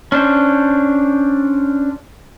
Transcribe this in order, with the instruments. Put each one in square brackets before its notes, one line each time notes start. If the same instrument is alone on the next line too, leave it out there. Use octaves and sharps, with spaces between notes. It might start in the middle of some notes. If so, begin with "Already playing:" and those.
[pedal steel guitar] C#4 D4 C5